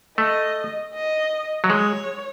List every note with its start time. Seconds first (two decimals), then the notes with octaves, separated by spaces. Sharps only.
0.18 A3 D#5
0.94 D#5
1.64 F#3
1.70 G#3 C#5